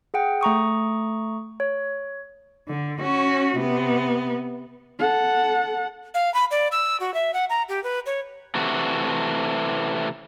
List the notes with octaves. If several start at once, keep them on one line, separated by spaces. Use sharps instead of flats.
G#4 F#5 G5
A3 A#5 C#6 D#6
C#5
D3
C#4 F#4
C3 B3
A4 F#5
F5
B5
D5
E6
F#4
E5
F#5
A#5
G4
B4
C#5
C3 E3 A3 F#4